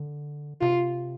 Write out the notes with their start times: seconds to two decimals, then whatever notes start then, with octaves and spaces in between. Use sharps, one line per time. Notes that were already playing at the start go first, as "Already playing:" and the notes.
Already playing: D3
0.61 C3 F4